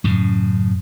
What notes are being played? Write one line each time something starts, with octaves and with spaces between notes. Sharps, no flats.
F#2 A2 C#3